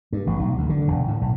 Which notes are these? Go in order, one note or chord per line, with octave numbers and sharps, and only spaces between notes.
G2
A1
B1
D2
D3
E1
A2
B1